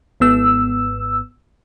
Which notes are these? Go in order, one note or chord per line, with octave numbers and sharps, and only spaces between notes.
G#1 G#2 B3 E6